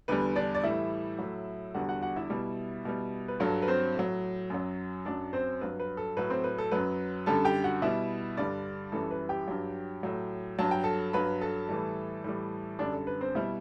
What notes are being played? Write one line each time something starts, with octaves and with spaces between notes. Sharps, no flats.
E2 D3 G3 B4
D4 D5
D5
A2 E3 G3 E4 E5
A2 F#3
E2 D3 G3 F#4 F#5
F#4 F#5
F#4 F#5
E4 E5
B2 G3
B2 G3
B4
G2 F#3 A4
B4
C4 C5
A2 F#3
F#2 F#3
F#2 F#3 D4 D5
C4 C5
G2 F#3 B4
B4
A4
A2 F#3 B4
C4 C5
B4
A4
F#2 F#3 B4
F#2 D3 G3 A4 A5
G4 G5
F#4 F#5
B2 G3 E4 E5
G2 D3 G3 D4 D5
F#2 E3 G3 A4
B4
G4 G5
G2 F#3
A2 F#3
G2 F#3 A5
G5
A4 A5
G2 F#3 B4 B5
A4 A5
A2 E3 G3
A2 E3 G3
F#2 D3 G3 D4 D5
A4
B4
C4 C5
B2 G3 E4 E5